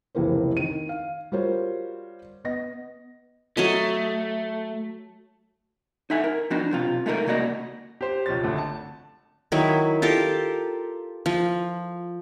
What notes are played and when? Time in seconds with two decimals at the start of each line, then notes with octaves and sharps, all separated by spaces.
0.15 F1 C#2 E3 A#3 C5
0.57 D#3 D#7
0.89 F5
1.32 G3 F4 F#4 A#4 C5 C#5
2.45 B3 D#5 A#6
3.57 F#3 A3 C#5 D#5
6.10 D#4 A4 E5 F#5 G#5
6.24 A#4
6.50 F3 B3 D4 D#4 F#4
6.71 B1 C3 F4
7.06 G#3 A3 D#4 A4 A#4
7.26 C#2 C3 A#3 F#4 D5 D#5
8.01 G4 C5
8.26 E1 C#2 F3 C#5 A6
8.43 G#1 D3 A3
8.58 A5
9.52 D#3 F#3 E4
10.02 F4 G4 A4 A#4
11.26 F3